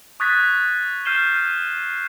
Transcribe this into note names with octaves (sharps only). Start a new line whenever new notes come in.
C#6 D#6 F#6 G#6 A6 B6
F6 G6 C7 D#7 E7 G7